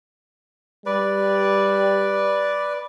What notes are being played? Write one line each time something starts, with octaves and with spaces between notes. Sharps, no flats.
G3 B4 D5